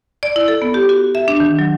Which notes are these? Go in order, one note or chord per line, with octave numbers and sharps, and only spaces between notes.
D5
E4
A4
B3
G4
F#4
E5
D4
D#3
F#3